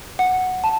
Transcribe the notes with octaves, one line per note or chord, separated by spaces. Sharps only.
F#5
A5